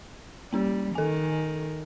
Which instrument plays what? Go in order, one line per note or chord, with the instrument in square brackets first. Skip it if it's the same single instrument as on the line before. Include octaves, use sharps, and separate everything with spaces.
[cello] G3 [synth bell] A#3 C#4 G4
[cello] D#3 [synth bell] A4 G#5